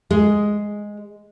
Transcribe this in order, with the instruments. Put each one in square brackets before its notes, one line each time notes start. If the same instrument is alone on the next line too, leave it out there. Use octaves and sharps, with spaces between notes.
[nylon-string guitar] G#3